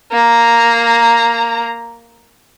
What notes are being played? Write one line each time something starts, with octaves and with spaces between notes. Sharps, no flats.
A#3 A#5